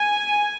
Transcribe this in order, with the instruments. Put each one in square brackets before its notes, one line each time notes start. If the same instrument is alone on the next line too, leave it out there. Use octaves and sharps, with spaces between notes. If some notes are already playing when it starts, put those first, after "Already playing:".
Already playing: [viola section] G#5